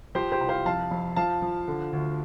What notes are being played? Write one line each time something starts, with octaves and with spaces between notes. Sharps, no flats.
F3 G4 C5
G4 C5
C2
C5 F5
F2 F5 A5
F2
F3 F5 A5
F3
D3
D2